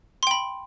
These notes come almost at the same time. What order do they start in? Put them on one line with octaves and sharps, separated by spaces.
C6 G5 B5